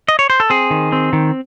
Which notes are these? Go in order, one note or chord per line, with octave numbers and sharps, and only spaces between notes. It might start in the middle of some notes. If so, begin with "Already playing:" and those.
D#5
C#5
C5
A4
C4 G#4
D#3
C4
D#3